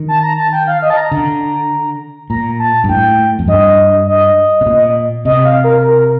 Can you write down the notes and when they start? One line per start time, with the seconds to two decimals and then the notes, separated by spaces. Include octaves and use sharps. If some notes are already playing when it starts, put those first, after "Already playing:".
Already playing: D#3
0.08 A5
0.23 A#5
0.37 A5
0.53 G5
0.67 F5
0.82 D#5
0.90 A5
0.97 A#5
1.12 D3
2.30 A#2 A#5
2.59 A5
2.84 G2
2.89 A2 G5
3.39 F2
3.48 G2 D#5
4.07 D#5
4.61 C3
4.66 A#2
5.25 C3 D#5
5.45 F5
5.64 A#4
5.83 A#4